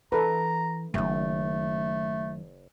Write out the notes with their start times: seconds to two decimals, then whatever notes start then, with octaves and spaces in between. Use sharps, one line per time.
0.12 E3 A4 B4 A#5
0.94 F#1 F#2 D#3 A3